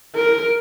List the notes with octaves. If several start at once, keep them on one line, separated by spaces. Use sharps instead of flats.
A#4